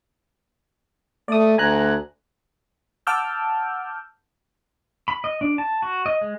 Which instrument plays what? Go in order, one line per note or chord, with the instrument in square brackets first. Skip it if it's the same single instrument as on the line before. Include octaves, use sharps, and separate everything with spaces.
[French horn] A3 [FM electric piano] D5 D#6
[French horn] D2 [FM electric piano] G#5 A#5 F#6
[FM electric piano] F#5 A5 D6 E6 F6 G6
[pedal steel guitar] B5
D#5
D4
A5
F#4
D#5
G#3